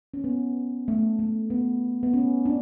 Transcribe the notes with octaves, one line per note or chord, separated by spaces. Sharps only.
C#4
B3
A3
A3
B3
B3
C#4
D4